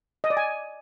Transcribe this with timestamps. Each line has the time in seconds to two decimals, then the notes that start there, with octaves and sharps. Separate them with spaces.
0.24 D#5
0.30 D5
0.37 G#5